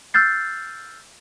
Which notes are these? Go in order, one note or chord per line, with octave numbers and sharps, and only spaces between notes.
E6 F6 G6 A6 C7